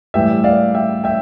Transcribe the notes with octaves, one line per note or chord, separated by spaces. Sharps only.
A2 E3 G3 E5 G5
D5 F5
E5 G5
E5 G5